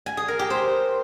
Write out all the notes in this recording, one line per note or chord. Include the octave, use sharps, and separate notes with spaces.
G#5
G#4
A#4
G4
C5